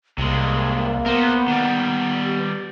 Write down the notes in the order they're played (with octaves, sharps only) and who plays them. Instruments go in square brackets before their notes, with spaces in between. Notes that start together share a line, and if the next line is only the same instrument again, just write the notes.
[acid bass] C2 [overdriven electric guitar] C3 G#3 [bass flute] A#3
[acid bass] B3 [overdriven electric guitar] A#4 C5
[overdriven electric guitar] D#3 G3
[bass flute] G4